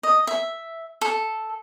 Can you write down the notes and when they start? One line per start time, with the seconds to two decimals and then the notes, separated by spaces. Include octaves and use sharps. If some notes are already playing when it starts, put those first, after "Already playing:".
0.03 D#5
0.27 E5
1.01 A4